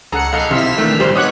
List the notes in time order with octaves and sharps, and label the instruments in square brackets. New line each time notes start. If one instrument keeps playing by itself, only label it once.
[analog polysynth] C#2 F#5 C#7 [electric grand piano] G#4 A4 A#5
[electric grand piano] B1 A4 D#5 [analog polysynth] F5
[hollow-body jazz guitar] C3 E4 [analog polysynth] E6 F6 B6
[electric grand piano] D#3 E3 D4 [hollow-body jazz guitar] A3
[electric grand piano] A#1 G#2 [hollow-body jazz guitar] G3 C5
[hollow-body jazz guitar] B3 D#4 [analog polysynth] C#5 F#6 [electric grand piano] F#5 D6 D#6